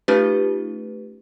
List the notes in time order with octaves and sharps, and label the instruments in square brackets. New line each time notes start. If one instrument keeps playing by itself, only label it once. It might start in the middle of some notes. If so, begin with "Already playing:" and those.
[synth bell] A3 C#4 D#4 F4 G4 B4